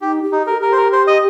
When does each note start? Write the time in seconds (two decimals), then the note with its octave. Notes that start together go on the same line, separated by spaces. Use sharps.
0.01 D#4 G4
0.22 G4
0.32 D#4
0.42 G4
0.47 A4 A#4
0.59 G4 A#4
0.72 C5
0.77 A#4
0.92 C5
1.07 D#5